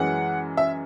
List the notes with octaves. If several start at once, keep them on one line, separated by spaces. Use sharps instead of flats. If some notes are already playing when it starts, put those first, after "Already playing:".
Already playing: F#2 E3 G#3 C#4 F#5
E5